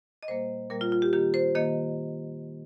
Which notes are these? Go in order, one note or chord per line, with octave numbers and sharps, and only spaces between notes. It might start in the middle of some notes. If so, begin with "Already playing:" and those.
D#5
A#2 G3 A#3 C5
A#2 G3 A#3 A#4
F4
F4
G4
D#3 A#3 G4
C5
D#3 A#3 D#5